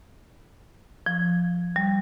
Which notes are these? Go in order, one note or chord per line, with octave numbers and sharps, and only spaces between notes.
F3
G3